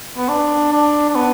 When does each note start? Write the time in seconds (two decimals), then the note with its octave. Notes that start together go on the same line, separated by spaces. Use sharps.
0.17 B3
0.29 D4
0.72 D4
1.09 D4
1.15 B3